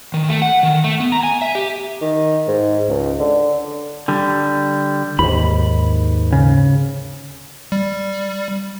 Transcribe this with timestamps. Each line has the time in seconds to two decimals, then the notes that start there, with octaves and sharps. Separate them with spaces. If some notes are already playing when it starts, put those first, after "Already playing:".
0.14 D#3
0.29 A3
0.42 F#5
0.63 D#3
0.84 A3
1.00 B3
1.12 A#5
1.23 G#5
1.42 E5
1.55 G4
2.01 D#3
2.48 G#2
2.89 C#2
3.20 D3
4.08 D3 G3
5.19 D#2 G#2 B5
6.33 C#3
7.72 G3